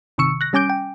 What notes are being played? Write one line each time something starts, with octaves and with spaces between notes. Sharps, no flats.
G1 C3 D#3 C#6 E6 C#7
F#6 A#6
G3 C#4 G#5 D6 G6 D7
G5